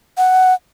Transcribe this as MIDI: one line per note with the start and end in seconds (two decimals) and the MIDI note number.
0.17 0.54 78